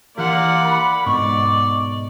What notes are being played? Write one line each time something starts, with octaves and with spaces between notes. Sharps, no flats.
E3 A#3 G4 D5 F#5 C6
B5
G#2 B2 D5 C#6